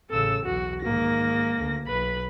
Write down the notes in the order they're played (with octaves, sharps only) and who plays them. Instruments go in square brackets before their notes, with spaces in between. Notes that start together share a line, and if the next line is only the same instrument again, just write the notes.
[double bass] A1 C#3 [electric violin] A4 E6
[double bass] B1 E2 [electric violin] F#4
[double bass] G#2 D#3 [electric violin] A#3 A#6
[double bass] D2
[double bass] B1 [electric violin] B4 B5